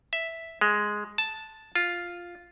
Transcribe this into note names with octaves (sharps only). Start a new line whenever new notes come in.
E5
G#3
A5
F4